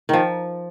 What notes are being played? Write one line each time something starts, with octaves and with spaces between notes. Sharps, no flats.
D#3 F3